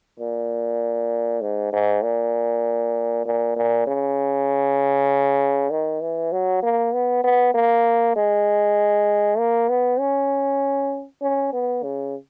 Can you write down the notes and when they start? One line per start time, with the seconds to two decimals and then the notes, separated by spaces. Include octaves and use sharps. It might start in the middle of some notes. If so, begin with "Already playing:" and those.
0.20 A#2
1.41 G#2
1.73 G#2
2.03 A#2
3.26 A#2
3.56 A#2
3.87 C#3
5.70 D#3
6.02 E3
6.32 F#3
6.62 A#3
6.93 B3
7.24 B3
7.54 A#3
8.16 G#3
9.38 A#3
9.69 B3
9.99 C#4
11.22 C#4
11.53 B3
11.83 C#3